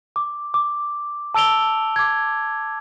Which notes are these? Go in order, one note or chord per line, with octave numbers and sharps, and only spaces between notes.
D6
D6
A5 E6 D7 F7 G7
D6 G#6